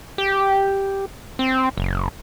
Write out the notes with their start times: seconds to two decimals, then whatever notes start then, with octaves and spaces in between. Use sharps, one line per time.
0.18 G4
1.39 C4
1.77 F#1